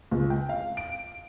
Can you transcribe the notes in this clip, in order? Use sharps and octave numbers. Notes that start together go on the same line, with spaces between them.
C#2
G5
F5
D7